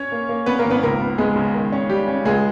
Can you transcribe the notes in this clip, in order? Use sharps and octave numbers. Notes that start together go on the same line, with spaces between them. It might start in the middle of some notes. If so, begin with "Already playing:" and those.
Already playing: C#4 C#5
A#3
A#3
A#3 B3 B4
A#3 A#4
G#1
B3 B4
C#2 A#3 A#4
B3
G#3 B3 G#4
C#3
D#3
C#4
G3 G4
C#4
C#2 G#3 G#4